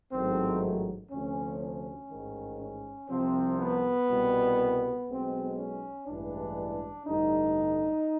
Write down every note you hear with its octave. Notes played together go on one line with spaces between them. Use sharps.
A1 G#2 D#3 F#3 A3 C4
D2 C3 F3 C#4
C#4
A1 G#2 D#3
C#4
C2 C3 F3 C4
B3
C2 B2 G3
B1 B2 G#3 C4
C#4
A1 G2 E3 G#3 D4
A1 G2 D3 G3 D#4